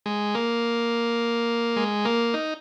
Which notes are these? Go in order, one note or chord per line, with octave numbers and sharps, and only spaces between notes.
G#3
A#3
G#3
A#3
D#4